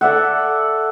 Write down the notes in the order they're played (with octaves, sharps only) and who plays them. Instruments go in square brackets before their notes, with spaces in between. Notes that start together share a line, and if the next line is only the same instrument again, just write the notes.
[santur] A4 D5 E5 F#5